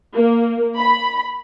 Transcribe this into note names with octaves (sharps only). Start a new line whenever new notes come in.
A#3
B5